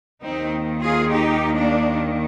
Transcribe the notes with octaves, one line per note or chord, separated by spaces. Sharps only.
D#2 D#3 C4 D#4
F4 G#4
D#4 G4
A#3 D4